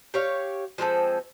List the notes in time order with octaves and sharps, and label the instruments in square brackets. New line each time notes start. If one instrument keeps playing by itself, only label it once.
[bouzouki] G4 C#5 F5
F3 G#3 C4 A4